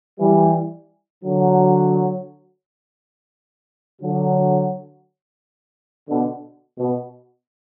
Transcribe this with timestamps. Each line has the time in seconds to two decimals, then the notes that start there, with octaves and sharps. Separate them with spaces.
0.20 E3 G3
1.24 D3 F#3
4.01 D3 F#3
6.09 B2 D3
6.79 B2